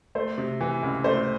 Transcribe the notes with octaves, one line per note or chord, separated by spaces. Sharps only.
A3 C5
C3
E3
C#2
A3 C5